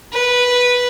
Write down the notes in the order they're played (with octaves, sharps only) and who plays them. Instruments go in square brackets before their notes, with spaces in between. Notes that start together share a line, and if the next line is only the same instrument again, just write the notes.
[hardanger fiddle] B4